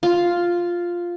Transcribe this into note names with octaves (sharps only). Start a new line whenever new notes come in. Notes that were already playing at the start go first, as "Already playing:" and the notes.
F4